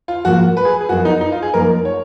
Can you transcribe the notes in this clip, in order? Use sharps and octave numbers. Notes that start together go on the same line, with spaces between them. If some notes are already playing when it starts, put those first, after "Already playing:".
F4
G#2 F3 A#3 F#4
B4
G#4
G#4
F#2 F3 B3 F4 F#4
D#4
D#4
F4
G#4
F#2 F3 A#3 D#4 A#4
C#5